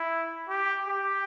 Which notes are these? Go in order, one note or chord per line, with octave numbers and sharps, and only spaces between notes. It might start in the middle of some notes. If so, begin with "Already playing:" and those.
Already playing: E4
G4
G4